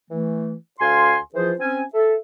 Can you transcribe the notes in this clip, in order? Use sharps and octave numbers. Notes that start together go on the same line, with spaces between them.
E3 A3
D2 F5 G#5 C6
E3 F3 F4 G#4 C5
C4 C#4 G#5
A4 E5